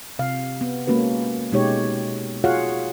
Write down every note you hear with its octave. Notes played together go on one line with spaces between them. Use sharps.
C3 F5
B3
G#3 A#3 C#4 F#4 B4
B2 G#3 D#4 G4 C#5
F4 F#4 G#4 C#5 F5 F#5